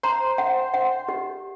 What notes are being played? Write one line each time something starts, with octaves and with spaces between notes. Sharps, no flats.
C5 A#5
F#5
F#5
G4